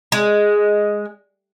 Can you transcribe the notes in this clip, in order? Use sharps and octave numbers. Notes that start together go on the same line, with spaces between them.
G#3